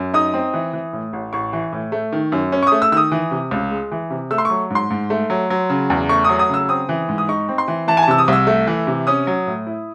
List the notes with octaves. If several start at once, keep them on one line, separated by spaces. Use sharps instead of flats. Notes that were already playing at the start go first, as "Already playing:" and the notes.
Already playing: F#2
D#4 D#6
C4
E3
E3
A2
A1
A1 C#6
E3
A2
A3
D#3
F#2
C#4
C#6
A3 D#6
E6
D#3 D#6 E6
E3
C3
C#2
G#3
E3
C3
A3 E6
C6
F#3 C#6
G#2 C6
G#2
A3
F#3
F#3
C#3
E2
A3 C#6
F#3 D#6
D#6
C#3 E6
C4 D#6
E3
G#2
D#6
D#4 C#6
C4
C6
E3
E3 A5
G#5
A5
C3 E6
D#6
C2 E6
A3
E3
C3
C#4 D#6
F#3
A2
E4